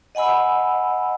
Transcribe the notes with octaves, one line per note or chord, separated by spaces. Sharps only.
D#5 F#5 G#5 B5 E6